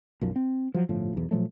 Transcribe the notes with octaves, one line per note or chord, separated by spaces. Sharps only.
B1 F#2 F3
C4
F3 F#3
G1 A2 F3
B1 E2
A#2 F3 F#3 A3